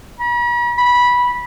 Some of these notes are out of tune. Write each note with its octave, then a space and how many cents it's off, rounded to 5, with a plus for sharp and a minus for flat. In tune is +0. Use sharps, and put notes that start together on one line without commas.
B5 -45
B5 -15